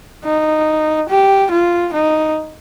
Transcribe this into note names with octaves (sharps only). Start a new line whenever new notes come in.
D#4
G4
F4
D#4